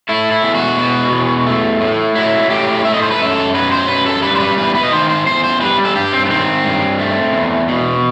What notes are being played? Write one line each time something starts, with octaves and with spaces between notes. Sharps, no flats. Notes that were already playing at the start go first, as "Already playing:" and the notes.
A3 E4
E4
E2
F#4
B2
E2
A3
A2
F#3 E4
A2 G4
A3 E5
D#5
C5
B4
F#2 A4
F#3 B4
C5
F#2 B4
A4
G3 B4
C5
B4
E2 B4
B4
D#5
D#3 C5
C5
E2 C5
C5
G3 B4
A4
G2 G4
C4
B3
D#3 C4
G2
A3
E2
B2